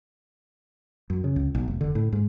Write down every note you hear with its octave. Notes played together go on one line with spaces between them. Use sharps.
F#2
C#3
C#2
B1
F1
D3
A2
G#2